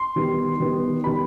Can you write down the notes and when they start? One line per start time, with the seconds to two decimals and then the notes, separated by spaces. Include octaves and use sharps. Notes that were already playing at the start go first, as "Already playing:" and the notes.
Already playing: C6
0.16 D#3 G3 B3
0.60 D#3 G3 B3
1.04 D#3 G3 B3 B5